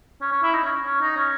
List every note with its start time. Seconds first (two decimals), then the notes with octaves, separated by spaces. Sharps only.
0.21 C#4
0.31 C#4
0.43 E4
0.53 D#4
0.64 C#4
0.85 C#4
1.01 D#4
1.16 C#4